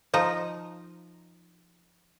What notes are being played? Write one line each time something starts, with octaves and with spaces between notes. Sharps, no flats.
F3 D#4 A#5